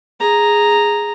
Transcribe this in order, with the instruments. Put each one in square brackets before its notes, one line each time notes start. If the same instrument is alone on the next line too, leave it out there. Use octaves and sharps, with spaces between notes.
[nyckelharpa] G#4 A#5